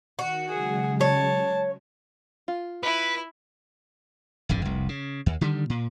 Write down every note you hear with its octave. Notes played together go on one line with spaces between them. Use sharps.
D#3 F#4
C#3 F#3 G#3 G#4
C#5 A5
F4
E4 B4
D1 G#1 F2 D3
F1 C2
C#3
D#2
D3 D#3 G3
A#2